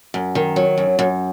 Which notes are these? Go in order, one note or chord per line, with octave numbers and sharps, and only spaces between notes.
F#2
D#3
F#3
F#2
F#2